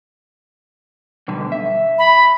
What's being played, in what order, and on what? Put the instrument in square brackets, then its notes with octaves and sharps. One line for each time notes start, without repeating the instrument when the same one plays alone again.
[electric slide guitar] B2 D3 G3
E5
[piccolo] B5